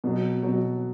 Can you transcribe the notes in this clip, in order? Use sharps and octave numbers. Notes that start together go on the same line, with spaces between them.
B2 F#3
B2 F#3